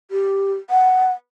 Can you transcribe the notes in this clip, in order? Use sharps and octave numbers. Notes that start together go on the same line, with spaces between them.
G4
F#5